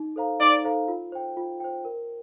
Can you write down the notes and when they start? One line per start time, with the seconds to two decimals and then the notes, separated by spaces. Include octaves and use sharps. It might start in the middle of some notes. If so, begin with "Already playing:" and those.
Already playing: D#4
0.16 A4 C5 F5 A#5
0.40 D#4 D5
0.64 A4 C5 F5 A#5
0.88 F4
1.12 C5 G5
1.37 F4
1.60 C5 G5
1.85 A#4